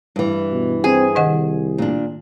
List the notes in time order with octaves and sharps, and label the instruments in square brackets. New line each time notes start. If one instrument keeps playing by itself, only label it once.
[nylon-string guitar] G2 E3
[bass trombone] B2
[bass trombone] C4 [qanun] G#4
[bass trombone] C2 [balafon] D#3 D#5 F#5
[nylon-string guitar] A#2 D4